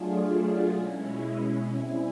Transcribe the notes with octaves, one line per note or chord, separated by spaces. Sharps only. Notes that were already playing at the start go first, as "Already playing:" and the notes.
Already playing: F#3 A3 D4 F4 G#4
B2 G#3 C#4 E4
G3 C4 E4 G#4